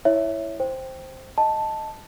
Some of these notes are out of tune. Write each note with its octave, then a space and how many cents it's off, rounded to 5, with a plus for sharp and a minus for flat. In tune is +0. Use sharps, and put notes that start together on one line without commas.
E4 +0 C#5 +0 E5 +0
C5 +5 G5 +0
D#5 +5 A5 +0